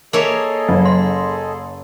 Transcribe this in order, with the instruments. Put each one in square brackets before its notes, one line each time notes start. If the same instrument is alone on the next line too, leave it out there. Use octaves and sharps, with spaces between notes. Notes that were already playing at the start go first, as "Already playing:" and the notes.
[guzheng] A#3 C#5 E5 [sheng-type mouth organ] G#4 A4 D#5
[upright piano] F#1 [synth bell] F#3
[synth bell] C6